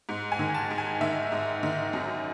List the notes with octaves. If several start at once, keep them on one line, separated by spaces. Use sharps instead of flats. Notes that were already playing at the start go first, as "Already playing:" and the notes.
G#2
G#5
D#3
A5
G#2
G#5
D#3 E5
G#2
D#3
F#2